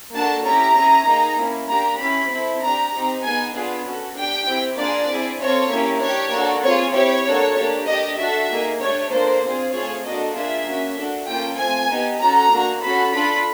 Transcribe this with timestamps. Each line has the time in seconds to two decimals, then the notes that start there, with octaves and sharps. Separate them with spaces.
0.14 A#3 D4 F#4 A4 A5
0.45 C#4 E4 G4 A#5
0.76 C#4 E4 G#4
1.07 A#3 D#4 G#4
1.38 A#3 C#4 E4
1.69 A#3 D4 G4 A#5
2.00 C#4 E4 G4 B5
2.30 C4 E4 A4
2.62 D4 G4 A#5
2.93 C4 D#4 G4
3.23 B3 D#4 G#4 G#5
3.54 B3 D4 F4 G#4
3.85 C#4 F#4 A4
4.16 D4 G4 G5
4.47 C4 E4 G4
4.78 A#3 D4 F4 G#4 D5
5.09 C4 E4 G#4
5.39 C4 F4 A4 C#5
5.71 A#3 C#4 E4 G4
6.02 D4 G4 C#5
6.32 A#3 D4 F#4 A4
6.63 C4 F4 G#4 C#5
6.94 C4 E4 G4 C#5
7.26 A#3 D4 F#4 A4
7.56 A#3 D4 G4
7.87 D4 G4 D#5
8.18 D4 F#4 A4 E5
8.50 A#3 D#4 G#4
8.80 A3 D4 G4 C#5
9.11 A#3 D4 F4 A4 C5
9.42 C4 F4 G#4
9.72 A3 C4 F4 G#4 C#5
10.03 A#3 D4 F#4 A4 D#5
10.34 A#3 D4 F4 G#4 E5
10.66 A#3 C#4 F#4
10.96 D4 F#4 A4
11.27 A#3 C#4 F4 A4 G5
11.58 A3 C4 F4 G#5
11.89 B3 D#4 G4
12.19 C#4 F#4 A4 A#5
12.50 A#3 D4 F#4
12.82 C#4 F#4 A4 B5
13.13 D4 F4 A4 B5